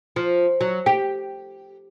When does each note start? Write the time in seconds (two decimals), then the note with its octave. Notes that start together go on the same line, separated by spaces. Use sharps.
0.16 F3
0.61 F#3
0.86 G4